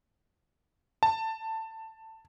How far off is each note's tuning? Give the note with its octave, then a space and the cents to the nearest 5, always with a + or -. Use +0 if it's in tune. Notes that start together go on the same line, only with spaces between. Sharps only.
A5 +15